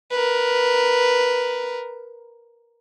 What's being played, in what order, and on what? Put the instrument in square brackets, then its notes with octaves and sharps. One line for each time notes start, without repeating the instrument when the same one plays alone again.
[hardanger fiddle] A#4 B4